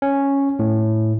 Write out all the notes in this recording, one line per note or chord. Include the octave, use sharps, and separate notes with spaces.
C#4
A2